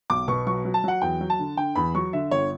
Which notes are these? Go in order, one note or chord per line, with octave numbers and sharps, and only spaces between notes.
B1 D6
B2 C#6
F#3 C#6
F#3
A5
F#3 F#5
E2 G5
F#3
A5
D3
D3 G5
E2 B5
F#3 C#6
D3 E5
G1 C#5